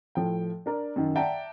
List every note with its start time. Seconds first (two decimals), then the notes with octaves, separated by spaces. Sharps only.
0.15 A2 F3 G5
0.66 D4 A#4 D5
0.96 F#2 D#3
1.16 D5 E5 F#5 G5 A5 A#5